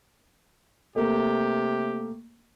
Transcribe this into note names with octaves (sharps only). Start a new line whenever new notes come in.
C3 A3 A#3 G4